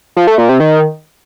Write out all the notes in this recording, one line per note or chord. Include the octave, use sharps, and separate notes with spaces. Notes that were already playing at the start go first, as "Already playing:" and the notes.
F3
A3
A#2
C3
D#3